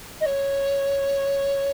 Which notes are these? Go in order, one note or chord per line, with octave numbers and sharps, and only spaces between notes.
D#5
C#5